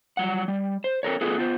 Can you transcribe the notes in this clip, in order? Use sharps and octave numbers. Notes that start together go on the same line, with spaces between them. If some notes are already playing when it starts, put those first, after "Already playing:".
F#3 G3 F#5
G3
C5
C4 A4 A#4 C#5
A3 B3 F4 G#4 A4 B4
B3 F4 C5